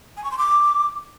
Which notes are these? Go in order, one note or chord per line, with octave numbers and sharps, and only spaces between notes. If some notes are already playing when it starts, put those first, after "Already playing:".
G#5
C#6
C6
D6